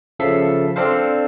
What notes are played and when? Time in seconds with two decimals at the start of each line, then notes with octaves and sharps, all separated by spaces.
0.19 C#3 F3 A4 E5 B6 C7
0.76 C4 D4 A4 C5 F5